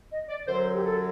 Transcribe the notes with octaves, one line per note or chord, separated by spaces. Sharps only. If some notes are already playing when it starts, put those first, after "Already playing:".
D#5
D5
F#2 D3 F#3 C5
G4
A4